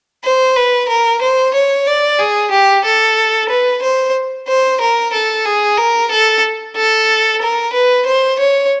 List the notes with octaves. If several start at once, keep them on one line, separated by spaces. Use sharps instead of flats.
C5
B4
A#4
C5
C#5
D5
G#4
G4
A4
B4
C5
C5
A#4
A4
G#4
A#4
A4
A4
A#4
B4
C5
C#5